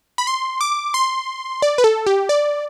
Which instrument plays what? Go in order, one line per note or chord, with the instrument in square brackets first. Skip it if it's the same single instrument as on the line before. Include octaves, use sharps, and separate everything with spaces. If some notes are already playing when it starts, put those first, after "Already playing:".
[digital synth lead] B5
C6
D6
C6
D5
B4
A4
G4
D5